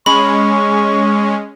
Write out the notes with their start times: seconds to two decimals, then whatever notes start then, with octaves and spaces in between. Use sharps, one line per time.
0.06 G#3 C#4 B5 C#6